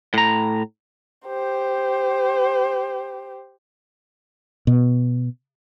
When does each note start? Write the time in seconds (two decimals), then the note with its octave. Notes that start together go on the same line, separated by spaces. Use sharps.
0.14 A2 A#5
1.27 G4 C5
4.67 B2